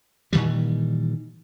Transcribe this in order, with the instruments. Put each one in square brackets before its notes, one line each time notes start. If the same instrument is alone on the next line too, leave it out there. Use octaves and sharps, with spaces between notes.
[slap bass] A#2 D#3 E3 G3